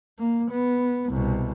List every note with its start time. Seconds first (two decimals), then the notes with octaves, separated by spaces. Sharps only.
0.19 A#3
0.51 B3
1.09 C2 B2